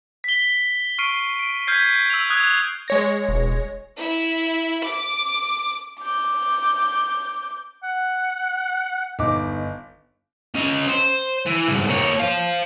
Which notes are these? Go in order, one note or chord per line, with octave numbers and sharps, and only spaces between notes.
B6 G7
C#6 F6 C7 D7 D#7
D7
F6 G6 G#6 B6 C7
E6 F7
D#6 F6 F#6 G#6 F7
G#3 C#5 A#6
E1
E4
D6
D6 G6
F#5
G1 D#4 D6
C#4 D#5
C5
E3
C2 G#2
A#3 C#5
C5 F5